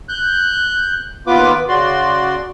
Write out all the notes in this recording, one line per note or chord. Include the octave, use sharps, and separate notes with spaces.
F#6 G6
D#2 B3 F4 B4 D6
C#3 F#4 D5 C6